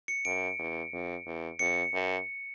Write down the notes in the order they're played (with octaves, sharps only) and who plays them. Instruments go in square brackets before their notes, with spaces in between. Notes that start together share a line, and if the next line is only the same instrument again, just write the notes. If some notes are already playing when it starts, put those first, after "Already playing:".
[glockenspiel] C#7
[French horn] F#2 [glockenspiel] D7
[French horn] E2
F2
E2
[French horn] F2 [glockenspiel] C#7
[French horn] F#2